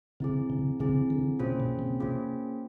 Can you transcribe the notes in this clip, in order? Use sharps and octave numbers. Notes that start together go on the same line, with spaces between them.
C#3 C4 E4 G#4
C#3
C#3 C4 E4 G#4
D3
C3 A#3 C#4 F4 G#4 C5
B2
C3
A#3 C#4 F4 G#4 C5